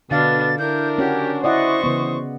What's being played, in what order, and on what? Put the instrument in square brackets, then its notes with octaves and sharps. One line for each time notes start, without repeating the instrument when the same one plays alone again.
[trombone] B2 [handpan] D3 F5 [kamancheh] D4 B4 [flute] A6
[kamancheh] D4 A#4 [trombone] E4 [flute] G6
[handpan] C#4 F#4 C#5 [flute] G4
[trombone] E4 [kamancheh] C5 C#6 [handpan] D5 D#5 F#5 [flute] D#6
[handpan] C#3 B3 [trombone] E3